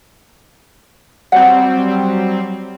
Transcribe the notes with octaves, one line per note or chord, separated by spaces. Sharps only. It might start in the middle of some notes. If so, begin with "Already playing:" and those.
F#3 G3 C4 F#5